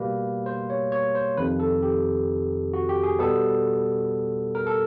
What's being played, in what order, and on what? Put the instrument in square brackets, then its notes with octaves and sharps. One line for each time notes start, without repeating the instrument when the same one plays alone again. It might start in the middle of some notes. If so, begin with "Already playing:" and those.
Already playing: [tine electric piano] B2 G3 A#3 B4
C5
C#5
C#5
C5
F2 C3 D#3 B4
A4
G4
F#4
G4
G#4
B2 G3 B3 A4
A#4
A4